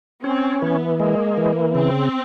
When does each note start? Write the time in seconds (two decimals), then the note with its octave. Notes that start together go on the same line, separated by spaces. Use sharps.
0.24 C4 C#4
0.62 E3 B3
1.00 G#3 A#3
1.37 E3
1.75 C#3 C4